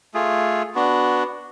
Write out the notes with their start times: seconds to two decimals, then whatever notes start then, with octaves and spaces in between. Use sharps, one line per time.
0.14 A3 F4 G#4
0.75 B3 D4 F#4